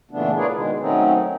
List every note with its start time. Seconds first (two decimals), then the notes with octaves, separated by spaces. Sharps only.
0.11 A#2 C#3 E3 A3 B3 D4
0.37 F4 G#4 A#4 B4 C#5 D5
0.52 B2 D#3 G#3
0.80 D#3 F#3 A3 C4 C#4 D#4